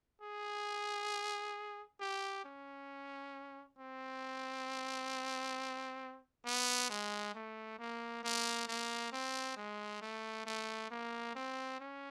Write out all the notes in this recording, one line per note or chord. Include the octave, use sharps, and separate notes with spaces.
G#4
G4
C#4
C4
B3
G#3
A3
A#3
A#3
A#3
C4
G#3
A3
A3
A#3
C4
C#4